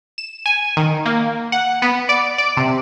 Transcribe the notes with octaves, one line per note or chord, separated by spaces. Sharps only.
E7
G#5
D#3
A#3
F#5
B3
D5
D5
C3